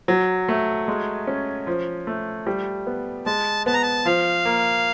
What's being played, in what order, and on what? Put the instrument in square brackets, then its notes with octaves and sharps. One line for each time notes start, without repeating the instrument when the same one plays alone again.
[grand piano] F#3
A3
G#3
C#4
F3
A3
G3
B3
[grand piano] G#3 [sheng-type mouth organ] A5
[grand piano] B3 [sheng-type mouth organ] A5
[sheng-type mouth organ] A#5
A5
[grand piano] F3 [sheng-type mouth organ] F5
[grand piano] A#3